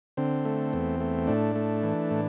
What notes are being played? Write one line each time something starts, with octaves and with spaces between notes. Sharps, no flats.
D3 C4
A3
E2
A3
A2 D4
A3
E3
A2